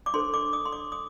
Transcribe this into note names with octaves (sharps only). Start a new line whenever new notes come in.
D6
D4 A4 C5 C6
D6
D#6
C6
D6
D#6